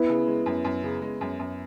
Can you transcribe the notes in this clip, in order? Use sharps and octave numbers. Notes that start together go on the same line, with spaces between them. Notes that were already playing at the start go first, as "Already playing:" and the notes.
Already playing: B3 E4
C#3
G#3
F#2
F#2
C#3
G#3
F#2
F#2